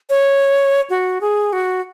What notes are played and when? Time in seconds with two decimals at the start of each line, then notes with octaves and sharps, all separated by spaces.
0.10 C#5
0.90 F#4
1.21 G#4
1.53 F#4